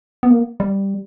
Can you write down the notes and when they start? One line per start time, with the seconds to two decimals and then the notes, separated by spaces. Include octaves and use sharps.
0.23 B3
0.31 A#3
0.60 G3